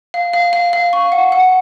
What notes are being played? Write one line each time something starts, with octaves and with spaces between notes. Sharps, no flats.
F5
F5
F5
F5
C#6
F#5
F#5